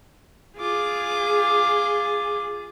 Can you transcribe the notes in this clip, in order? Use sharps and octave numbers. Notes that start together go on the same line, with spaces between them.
F4 G#4 D6